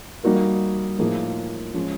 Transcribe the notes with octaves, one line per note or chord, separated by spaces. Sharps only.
G3 A#3 D#4 F#4 A#4
A2 F3 A#3 D#4 G#4
F3 G#3 C#4